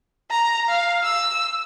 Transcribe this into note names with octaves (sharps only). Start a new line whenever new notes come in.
A#5
F5
E6